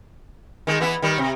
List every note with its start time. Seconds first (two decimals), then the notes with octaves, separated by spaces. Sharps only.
0.67 D#3 G#3
0.80 E3 B3 E4
1.02 D#3 G3
1.18 C3